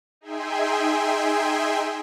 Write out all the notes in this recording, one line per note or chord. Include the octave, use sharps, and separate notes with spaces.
D#4 G#4 E5 G5 G#5 C6